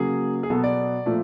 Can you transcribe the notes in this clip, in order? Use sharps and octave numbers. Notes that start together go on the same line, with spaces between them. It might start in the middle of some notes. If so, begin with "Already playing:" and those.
Already playing: C#3 F#3 A#3 G#4
G#4
B2 F#3 B3 A4
D5
A#2 F3 A3